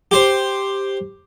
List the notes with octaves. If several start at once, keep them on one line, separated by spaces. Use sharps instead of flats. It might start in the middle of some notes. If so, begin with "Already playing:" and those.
G4 C5